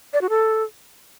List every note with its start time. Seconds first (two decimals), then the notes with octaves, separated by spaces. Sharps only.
0.13 D5
0.21 F#4
0.30 A4